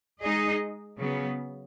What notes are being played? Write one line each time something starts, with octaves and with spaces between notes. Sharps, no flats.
G#3 D#4 G#4 D#5
C#3 F#3 B3